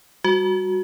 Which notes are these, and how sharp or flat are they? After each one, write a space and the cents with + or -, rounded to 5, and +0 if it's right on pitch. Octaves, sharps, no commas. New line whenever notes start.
G3 +0 F#4 -5